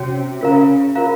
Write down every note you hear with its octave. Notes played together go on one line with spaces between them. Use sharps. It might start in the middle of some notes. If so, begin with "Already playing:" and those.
Already playing: C3 C#4 F#4 C#5
C#3 F4 A#4 F5 A#5
F4 A#4 F5 A#5